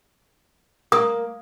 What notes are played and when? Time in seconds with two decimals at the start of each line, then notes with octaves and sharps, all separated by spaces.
0.92 A#3 D#6